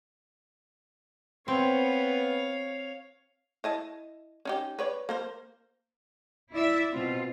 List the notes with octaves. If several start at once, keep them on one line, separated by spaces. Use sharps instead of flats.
B3 C4 C#5 F5
E4 D#5 A5
C#4 D#4 G4
B4 C#5 D5
A#3 A#4 C5
E4 D5 E5
B2 C4 F4